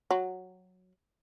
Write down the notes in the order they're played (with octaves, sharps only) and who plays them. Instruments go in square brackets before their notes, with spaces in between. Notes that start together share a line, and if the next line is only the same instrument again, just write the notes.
[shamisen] F#3